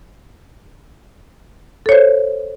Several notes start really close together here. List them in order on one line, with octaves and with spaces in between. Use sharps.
A4 C#5 C5